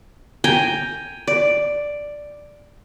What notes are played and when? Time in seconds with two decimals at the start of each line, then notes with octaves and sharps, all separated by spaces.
0.44 G5 G#5 A#5
1.27 D5